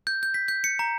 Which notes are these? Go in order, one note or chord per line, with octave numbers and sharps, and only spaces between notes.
G6
G6
B6
G6
C#7
A#5